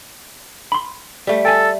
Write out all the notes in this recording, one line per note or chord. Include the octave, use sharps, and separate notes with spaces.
B5 C6
G3 A3
A4 G5 G#5